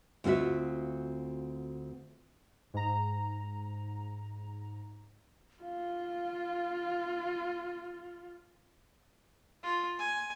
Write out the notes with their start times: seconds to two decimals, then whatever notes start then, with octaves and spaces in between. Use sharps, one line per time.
0.24 D2 C4 F4 F#4 E5
2.74 G#2 A#5
5.63 F4 F5
9.63 F4
9.99 G#5